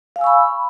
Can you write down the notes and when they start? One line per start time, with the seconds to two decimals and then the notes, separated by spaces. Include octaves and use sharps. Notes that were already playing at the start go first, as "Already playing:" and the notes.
0.16 F5
0.19 G#5
0.21 E6
0.24 C#6
0.27 B5